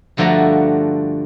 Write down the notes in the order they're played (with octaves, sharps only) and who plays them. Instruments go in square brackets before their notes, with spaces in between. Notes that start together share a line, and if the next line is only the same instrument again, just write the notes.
[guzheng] G2 D3 F3 A3 F#4 A#5